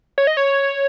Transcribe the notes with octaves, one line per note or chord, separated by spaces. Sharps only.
C#5
D#5
C#5